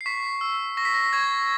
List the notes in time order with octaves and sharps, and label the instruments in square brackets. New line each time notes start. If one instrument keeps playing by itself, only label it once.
[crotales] C7
C#6 B6
E6
C#6 A#6
B6
A#6
C#6 G#6